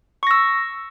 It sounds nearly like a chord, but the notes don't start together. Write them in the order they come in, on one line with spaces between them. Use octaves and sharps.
C#6 A#6 E6